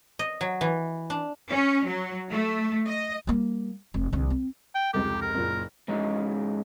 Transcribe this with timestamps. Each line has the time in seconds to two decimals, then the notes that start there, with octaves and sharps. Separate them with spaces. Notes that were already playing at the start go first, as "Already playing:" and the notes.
0.19 D#5
0.41 F#3
0.61 E3
1.10 D4
1.49 C#4
1.86 F#3
2.31 A3
2.86 D#5
3.27 G3 A#3
3.94 F1
4.13 C2 D3
4.30 C4
4.75 G5
4.94 F1 C#2 G4
5.22 A#4
5.35 F#1 A#2
5.88 G#2 E3 G#3 C#4 D#4